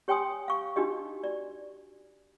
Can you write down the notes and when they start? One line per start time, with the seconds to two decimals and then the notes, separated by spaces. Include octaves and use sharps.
0.08 G4 C#5 G5 G#5 C6 D#6
0.48 F5 C#6
0.76 D4 D#4 F#4 G4 D#5
1.23 D5